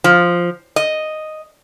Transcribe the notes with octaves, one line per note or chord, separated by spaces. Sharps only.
F3
D#5